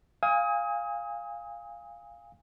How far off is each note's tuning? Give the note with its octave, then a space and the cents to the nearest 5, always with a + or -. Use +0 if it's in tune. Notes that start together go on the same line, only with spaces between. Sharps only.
F5 +0 G#5 -25 D#6 +30